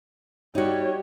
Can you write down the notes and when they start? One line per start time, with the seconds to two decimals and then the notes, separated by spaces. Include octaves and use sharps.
0.55 G3 D#4 F#4 C#5